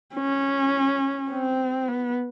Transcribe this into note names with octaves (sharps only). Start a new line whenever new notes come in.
C#4
C4
B3